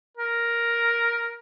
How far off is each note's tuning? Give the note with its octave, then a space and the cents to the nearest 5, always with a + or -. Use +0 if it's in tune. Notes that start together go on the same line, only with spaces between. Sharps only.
A#4 +5